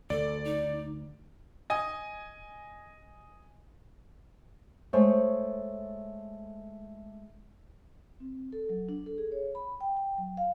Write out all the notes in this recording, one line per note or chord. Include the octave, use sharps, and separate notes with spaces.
D2 A4 D5
D#4
D#5 G#5 D#6
G#3 A3 C5 C#5
C4
A4
F#3
D4
A4
G#4
C#5
B5
G5
G5
F#3
F5